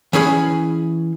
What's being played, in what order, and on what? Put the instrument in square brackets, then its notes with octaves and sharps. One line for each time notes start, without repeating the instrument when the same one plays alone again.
[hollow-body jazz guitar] E3 C#4 G#4 B5